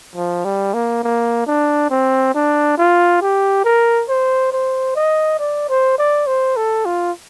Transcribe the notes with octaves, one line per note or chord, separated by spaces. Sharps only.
F3
G3
A#3
A#3
D4
C4
D4
F4
G4
A#4
C5
C5
D#5
D5
C5
D5
C5
A4
F4